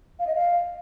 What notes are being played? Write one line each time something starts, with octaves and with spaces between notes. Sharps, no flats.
F5
D#5
F5